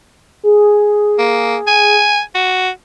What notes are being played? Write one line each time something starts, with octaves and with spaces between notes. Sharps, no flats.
G#4
A#3
G#5
F#4